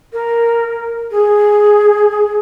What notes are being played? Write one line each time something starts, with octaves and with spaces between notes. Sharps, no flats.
A#4
G#4